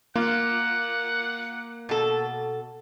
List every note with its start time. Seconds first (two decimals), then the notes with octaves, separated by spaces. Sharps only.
0.15 A#3 F4 F#5
1.89 B2 A4